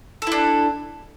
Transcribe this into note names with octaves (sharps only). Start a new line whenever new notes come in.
D4 E4 A4